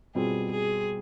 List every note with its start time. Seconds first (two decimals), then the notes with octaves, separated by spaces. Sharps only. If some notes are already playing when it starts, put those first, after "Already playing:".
0.15 B2 G3 C4 F4 G#4
0.51 G#4